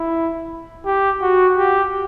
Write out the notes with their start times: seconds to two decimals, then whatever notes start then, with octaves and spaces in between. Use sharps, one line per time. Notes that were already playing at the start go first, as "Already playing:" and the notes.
Already playing: E4
0.86 G4
1.22 F#4
1.58 G4